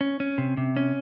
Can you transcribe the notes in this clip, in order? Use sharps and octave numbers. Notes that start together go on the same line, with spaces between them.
C#4
C#4
C3
C3
C#4